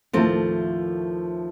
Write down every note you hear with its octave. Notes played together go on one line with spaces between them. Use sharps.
D#2 A2 F3 A3 C4 A4